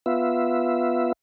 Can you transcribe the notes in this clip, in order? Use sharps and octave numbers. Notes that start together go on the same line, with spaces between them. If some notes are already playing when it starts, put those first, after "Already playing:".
B3 F4 E5